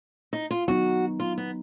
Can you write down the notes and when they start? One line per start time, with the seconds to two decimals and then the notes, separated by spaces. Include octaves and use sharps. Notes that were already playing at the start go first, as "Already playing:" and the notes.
0.33 D#4
0.51 F4
0.68 F#3 B3 D#4 F#4
1.20 F4
1.38 B3